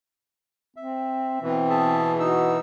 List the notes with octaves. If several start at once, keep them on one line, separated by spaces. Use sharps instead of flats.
C4 E5
B2 E3 C4
G#4 E5 A5
D#4 F#4 E6